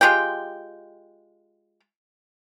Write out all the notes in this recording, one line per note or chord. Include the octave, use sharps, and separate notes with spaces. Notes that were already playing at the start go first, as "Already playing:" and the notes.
G#3 F4 G4 G5